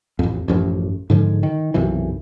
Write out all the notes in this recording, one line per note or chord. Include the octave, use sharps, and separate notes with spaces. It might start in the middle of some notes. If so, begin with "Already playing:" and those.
A1 F2
A1 F#2 F3
G#2 D3 F3 G#3
D#3
B1 F#2 C3 E3